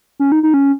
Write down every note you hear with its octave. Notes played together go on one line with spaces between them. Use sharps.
C#4
D#4
D#4
C#4